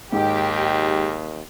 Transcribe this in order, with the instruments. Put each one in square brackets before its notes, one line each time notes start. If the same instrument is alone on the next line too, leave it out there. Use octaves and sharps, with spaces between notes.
[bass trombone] D#2 [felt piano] G#2 [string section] G4